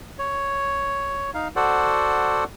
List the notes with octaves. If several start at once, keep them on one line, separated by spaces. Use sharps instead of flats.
C#5
D#4 F5
F#4 A4 C5 D5 F#5